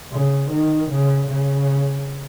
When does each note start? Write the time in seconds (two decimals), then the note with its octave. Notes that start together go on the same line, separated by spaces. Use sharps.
0.11 C#3
0.50 D#3
0.90 C#3
1.29 C#3